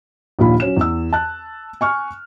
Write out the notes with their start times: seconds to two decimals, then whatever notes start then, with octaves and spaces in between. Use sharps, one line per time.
0.39 A#1 D#2 A#2 F4 B5
0.60 F#3 C#4 E7
0.77 E2 E6
1.13 A5 F#6
1.81 G#5 C#6 F6